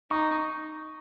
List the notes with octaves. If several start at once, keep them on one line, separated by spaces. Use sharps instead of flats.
D#4 C#6